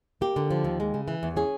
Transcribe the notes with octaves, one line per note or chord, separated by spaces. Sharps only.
A#3 G4
D3
F3
D#2
G#3
C#3
E3
E2
C#4 G#4